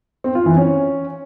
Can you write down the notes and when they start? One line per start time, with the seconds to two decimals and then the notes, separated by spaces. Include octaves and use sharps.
0.24 C4
0.35 F4
0.46 E3
0.57 C#4